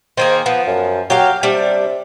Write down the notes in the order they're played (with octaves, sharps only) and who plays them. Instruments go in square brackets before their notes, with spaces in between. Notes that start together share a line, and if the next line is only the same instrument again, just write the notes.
[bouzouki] D#3 A#3 G#4 [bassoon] C5
[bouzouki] F3 [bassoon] B3
[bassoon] F#2
[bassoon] F#3 [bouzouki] G4 F5
[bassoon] C3 [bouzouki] G3 D4